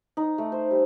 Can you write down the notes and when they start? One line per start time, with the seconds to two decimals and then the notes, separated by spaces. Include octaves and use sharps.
0.17 D#4
0.38 A3
0.52 C5
0.71 G3